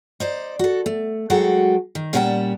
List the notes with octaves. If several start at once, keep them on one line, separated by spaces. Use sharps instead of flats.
D#4 C5 D5
F#4 A4
A3
F#3 G#3 F#4 A4 F#5 G5
D#3
A#2 G3 C#4 F#5 G5 A5